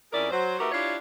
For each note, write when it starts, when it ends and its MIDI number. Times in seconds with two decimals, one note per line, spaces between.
0.12 0.27 41
0.12 0.27 61
0.12 0.27 64
0.12 0.27 68
0.12 0.27 70
0.12 0.27 74
0.31 0.58 54
0.31 0.58 72
0.59 0.69 57
0.59 0.69 63
0.59 0.69 66
0.59 0.69 67
0.59 0.69 70
0.59 0.69 71
0.72 0.95 62
0.72 0.95 64
0.72 0.95 65
0.72 0.95 67
0.72 0.95 73
0.72 0.95 74